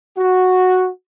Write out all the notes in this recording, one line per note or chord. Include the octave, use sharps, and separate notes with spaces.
F#4